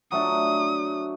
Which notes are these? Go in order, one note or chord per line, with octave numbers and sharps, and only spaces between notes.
F#3 A3 D4 D#6